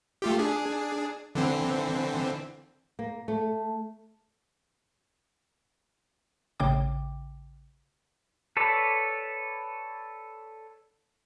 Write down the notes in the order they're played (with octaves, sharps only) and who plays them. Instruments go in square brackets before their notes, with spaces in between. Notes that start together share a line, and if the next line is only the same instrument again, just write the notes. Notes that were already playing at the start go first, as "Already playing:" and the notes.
[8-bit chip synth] A3 F4 G4
D4 G#4
D3 E3 C4
[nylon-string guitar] A#3
A3
[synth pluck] A1 C#3 G5 D6
[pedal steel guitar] A4 B4 C#5 D5